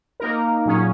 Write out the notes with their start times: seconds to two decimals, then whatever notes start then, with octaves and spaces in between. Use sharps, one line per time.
0.20 A#3 D#4 A#4
0.66 A#2 F#3 C#4 G#4